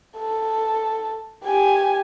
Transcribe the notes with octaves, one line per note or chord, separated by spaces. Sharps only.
A4
G4 G#5